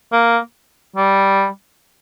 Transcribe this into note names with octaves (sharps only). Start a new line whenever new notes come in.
A#3
G3